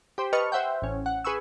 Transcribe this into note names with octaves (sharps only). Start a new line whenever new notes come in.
G4 C5
B4 D#5 A5 C#6 F6
C5 E5 F#5 G5
A1 C#4
F#5
G#4 B4 G#5 C#6 E6